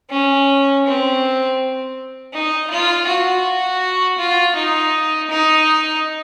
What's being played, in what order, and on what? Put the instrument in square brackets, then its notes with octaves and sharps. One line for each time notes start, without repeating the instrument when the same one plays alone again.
[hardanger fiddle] C#4
C4
D#4
F4
F#4
F4
D#4
D#4